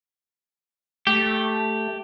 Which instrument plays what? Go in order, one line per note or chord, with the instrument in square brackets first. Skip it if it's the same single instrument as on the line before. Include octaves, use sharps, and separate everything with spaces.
[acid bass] A3 [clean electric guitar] G4